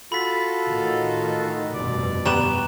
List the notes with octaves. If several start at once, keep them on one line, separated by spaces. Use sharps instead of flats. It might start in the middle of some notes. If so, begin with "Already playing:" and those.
F4 F#4 A4 B5 B6
A2 D#3
F1 G2 B2 D5
G3 B3 A#5 C#6 E7